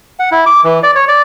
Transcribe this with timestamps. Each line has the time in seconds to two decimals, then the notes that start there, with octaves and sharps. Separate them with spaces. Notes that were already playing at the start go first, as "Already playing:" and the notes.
0.19 F#5
0.32 E4
0.46 D6
0.64 E3
0.83 D5
0.95 C#5
1.08 D5